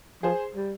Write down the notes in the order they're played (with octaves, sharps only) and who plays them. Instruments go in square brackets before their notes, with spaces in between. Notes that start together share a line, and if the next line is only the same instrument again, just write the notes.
[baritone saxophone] F3 [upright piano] G#4 C5
[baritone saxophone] G3